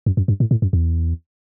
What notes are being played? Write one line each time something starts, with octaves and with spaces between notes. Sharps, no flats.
F#2
F#2
G2
A2
A2
F#2
E2